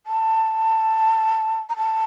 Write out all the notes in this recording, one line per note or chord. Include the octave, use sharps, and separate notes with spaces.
A5
A#5
A5